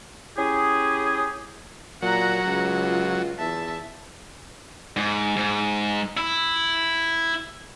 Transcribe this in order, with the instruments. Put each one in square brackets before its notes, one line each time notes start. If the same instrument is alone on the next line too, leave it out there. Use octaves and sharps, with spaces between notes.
[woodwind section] C#4 E4 G4 G#4
[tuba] A#2 [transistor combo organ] F#3 [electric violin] F#5 A#5
[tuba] C#2
[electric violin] F4
[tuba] E2 [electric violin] E5 A5
[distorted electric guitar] G#2
G#2
E4